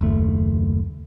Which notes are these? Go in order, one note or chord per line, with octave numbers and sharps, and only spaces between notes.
F#1 D#2 A3